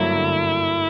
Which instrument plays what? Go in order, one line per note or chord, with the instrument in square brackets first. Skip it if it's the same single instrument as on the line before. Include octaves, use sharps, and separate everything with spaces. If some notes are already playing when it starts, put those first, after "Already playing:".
Already playing: [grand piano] G2 D3 F#3 A#3 [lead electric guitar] E4
[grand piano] D3